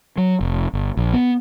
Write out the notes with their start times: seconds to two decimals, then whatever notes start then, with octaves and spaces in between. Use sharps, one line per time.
0.18 F#3
0.41 F1
0.73 G1
0.97 A#1
1.13 B3